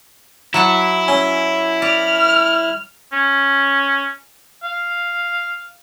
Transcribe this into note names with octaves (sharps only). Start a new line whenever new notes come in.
F#3 E4 F#5 A5
C#4
D5 F6
C#4
F5